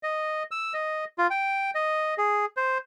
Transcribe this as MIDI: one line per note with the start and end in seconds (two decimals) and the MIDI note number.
0.03 0.43 75
0.51 0.73 88
0.74 1.05 75
1.18 1.27 65
1.30 1.71 79
1.75 2.14 75
2.18 2.45 68
2.57 2.78 72